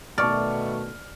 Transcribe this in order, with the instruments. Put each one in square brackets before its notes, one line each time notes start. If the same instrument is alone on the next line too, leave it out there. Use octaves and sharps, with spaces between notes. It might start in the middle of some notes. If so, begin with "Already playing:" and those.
[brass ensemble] B2 D#3 A3 [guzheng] D5 [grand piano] A5 C#6 F6